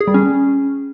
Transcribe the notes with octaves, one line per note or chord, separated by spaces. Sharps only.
G#4
G3
C#4